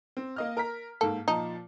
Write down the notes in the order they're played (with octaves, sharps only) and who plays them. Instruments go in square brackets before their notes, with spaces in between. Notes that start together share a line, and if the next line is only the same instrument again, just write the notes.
[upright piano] C4
A#3 D#5 F6
A#4 A#5 B6
[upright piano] G#2 A#3 [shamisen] A4
[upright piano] A#2 F3 A5 [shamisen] D#4